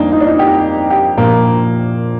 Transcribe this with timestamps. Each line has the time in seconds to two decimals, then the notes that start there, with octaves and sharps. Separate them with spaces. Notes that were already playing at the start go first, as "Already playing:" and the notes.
Already playing: F2 D3 G3 A#3 D4 D#4
0.12 D#4
0.21 D4
0.27 D#4
0.39 G4
0.90 G4
1.17 A#1 A#2 F3 A#3